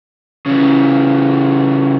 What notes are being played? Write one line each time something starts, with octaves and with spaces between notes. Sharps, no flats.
C#3 E3